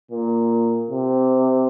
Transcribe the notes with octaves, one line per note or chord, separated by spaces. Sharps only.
A#2
C3